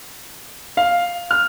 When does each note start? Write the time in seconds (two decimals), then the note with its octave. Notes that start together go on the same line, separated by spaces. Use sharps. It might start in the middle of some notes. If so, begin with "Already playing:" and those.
0.77 F5
1.31 F6